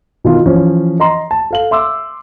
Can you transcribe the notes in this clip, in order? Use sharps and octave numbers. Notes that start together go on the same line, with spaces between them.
B2 D#3 E4 F4
E3 F3 C#4
D#5 A#5 C6
A5
A4 F5 F#7
E5 C6 D6 E6